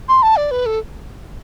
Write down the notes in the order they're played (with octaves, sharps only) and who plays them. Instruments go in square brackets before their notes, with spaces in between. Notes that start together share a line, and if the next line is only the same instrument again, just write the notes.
[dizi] C6
A5
D5
B4
A4